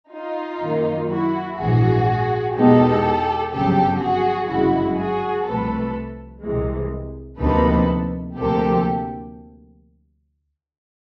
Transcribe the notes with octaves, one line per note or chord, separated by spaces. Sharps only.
D#4 F4
F#2 D#3 F#3 A#3
E4 F#4
A#1 G#2 E3 F#4 G#4
E2 B2 G#3 B3 D#4 G4 A4
G1 F2 C#3 F#3 G4 A4
F#4 G#4
G1 F#2 C#3 E3 G#3 E4 F#4
F#4 G#4
C2 C3 F3 A3 A4 B4
C2 C3 E3 G#3
D2 C3 F3 A#3 D#4 A4 B4
D2 C3 F3 A#3 G4 A4